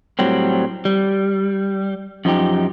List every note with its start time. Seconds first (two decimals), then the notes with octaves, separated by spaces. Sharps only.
0.19 A2 F#3 G3 C4
0.85 G3
2.25 F#2 F3 D#4 G4